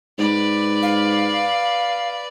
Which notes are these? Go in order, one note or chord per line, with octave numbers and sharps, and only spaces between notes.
G#2 B4 D5
F5